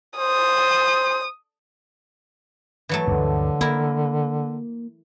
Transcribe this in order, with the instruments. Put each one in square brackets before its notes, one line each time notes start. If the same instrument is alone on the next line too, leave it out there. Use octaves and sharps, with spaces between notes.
[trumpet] C5 [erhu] D#6
[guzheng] E3 F#3 A3
[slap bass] D2 G2 [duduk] D3
[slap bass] A#3 [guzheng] E4 A#4